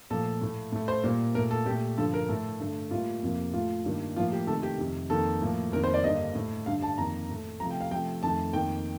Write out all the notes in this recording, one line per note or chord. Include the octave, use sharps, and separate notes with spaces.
A#2 F3 A3 A4
A2 A3
A2 A3
C5
A#2 G3 A#3
A#2 A3 A#4
A4
A#2 A3 G4
G2 D3 F3 A4
A#4
A2 A3 A4
G2 D3 A3
A2 G3 A#3 F4
F2 C3 F3 A#3
A2 A3 F4
G2 D#3 G3 A#3
A2 F3 A#3 F4
G4
C3 D#3 A3 A4
G4
F2 C3 D#3
F2 D#3 A#3 A4
A2 F3 A#3
F2 D#3 A#3 A#4
C5
D5
G2 D3 G3 A#3 D#5
A2 A3
G2 D3 G3 F5
A5
F2 D#3 A#3 A#5
A2 A3
C3 F3 A3 A#5
G5
F5
C3 F3 A3 G5
F2 D#3 A3 A5
F2 D#3 A#3 G5